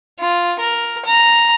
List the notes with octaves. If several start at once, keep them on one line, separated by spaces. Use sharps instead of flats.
F4
A#4
A#5